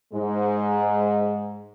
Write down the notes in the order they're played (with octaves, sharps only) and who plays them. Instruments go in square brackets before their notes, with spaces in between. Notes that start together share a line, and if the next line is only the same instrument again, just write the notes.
[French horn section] G#2 G#3